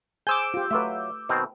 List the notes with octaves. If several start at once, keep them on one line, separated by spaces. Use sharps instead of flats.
G#4 C5 G#5 D6 E6 G6
F4 G4
F#3 A3 F4 B4 E5
B2 D#3 C4